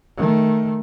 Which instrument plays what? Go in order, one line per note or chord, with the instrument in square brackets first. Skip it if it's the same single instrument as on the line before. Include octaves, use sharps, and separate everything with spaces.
[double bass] D#3 A3